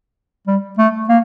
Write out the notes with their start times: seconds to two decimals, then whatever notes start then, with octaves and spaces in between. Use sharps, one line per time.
0.47 G3
0.78 A3
1.09 A#3